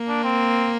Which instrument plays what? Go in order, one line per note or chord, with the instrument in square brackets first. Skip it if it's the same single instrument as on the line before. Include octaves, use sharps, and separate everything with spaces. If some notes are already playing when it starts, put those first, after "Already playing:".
Already playing: [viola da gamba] A#3
[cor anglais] D4
C4